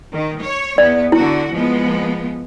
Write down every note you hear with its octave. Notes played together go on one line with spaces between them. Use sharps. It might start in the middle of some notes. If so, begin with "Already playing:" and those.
D#3
C#5
E2 B3 D5
D3 E4 F#4
F3 G#3 B3